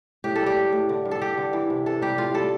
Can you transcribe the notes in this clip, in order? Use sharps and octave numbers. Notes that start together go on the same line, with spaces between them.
A2 G4
A4
G3
G4
A2
A2
D3
G2
A4
G2 G4
D3
E3
C3
C3 A4
G3 G4
A2 F4
G3 A4